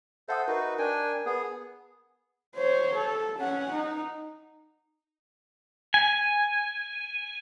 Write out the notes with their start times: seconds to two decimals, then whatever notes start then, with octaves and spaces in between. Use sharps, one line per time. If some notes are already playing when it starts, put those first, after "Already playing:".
0.29 A4 C5 E5 F#5 D#6
0.48 D#4 F#4 A#4 B4
0.79 D4 A#4 G5 G#5
1.26 B3 G#4
2.57 C5 C#5
2.95 A4
3.39 C#4 F#5
3.72 D#4
5.94 G#5